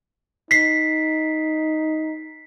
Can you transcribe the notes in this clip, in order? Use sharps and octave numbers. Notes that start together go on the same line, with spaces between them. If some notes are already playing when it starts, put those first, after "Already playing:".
D#4 B6 C7